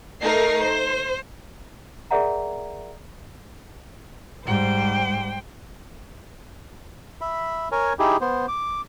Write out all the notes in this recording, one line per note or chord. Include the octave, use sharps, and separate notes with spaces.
A3 D#4 A#4 C7
C5
G#4 A#4 D5 E5 F#5 A#5
G#2 G3 C5 G5
E5 B5
A#4 C#5 G#5
D#4 E4 G4 G#4
B3 C5
D6